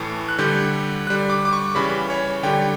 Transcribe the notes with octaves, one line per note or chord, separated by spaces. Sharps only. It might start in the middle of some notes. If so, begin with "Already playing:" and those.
Already playing: A2 E3 A3
F#6
D3 G3 G6
D3 G3 F#6
D6
D6
C#6
C#3 E3 G3 B5
C#5
D3 G3 G5